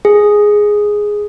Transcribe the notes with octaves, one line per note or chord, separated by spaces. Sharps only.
G#4